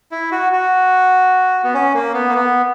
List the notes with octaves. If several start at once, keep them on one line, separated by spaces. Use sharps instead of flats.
E4
F#4
F#4
B3
C#4
A#3
B3
A#3
B3